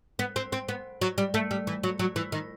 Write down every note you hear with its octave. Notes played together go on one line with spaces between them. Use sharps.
B3
C4
C4
B3
F#3
G3
A3
G3
E3
F#3
F#3
E3
D#3